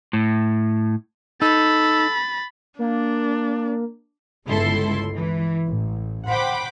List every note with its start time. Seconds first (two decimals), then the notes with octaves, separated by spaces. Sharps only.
0.13 A2
1.42 D#4 A4 B5 A6
2.79 A#3 D4
4.46 G1 C#2 E4 A4 C6
5.16 E3
5.67 A1
6.27 C5 F#5 G5 B5 D6